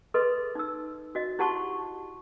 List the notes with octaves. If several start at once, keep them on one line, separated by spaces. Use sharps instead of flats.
G#4 A4 B4 D#5 C6
D#4 E6
F#4 D#5
E4 G4 F#5 A5 C6 C#6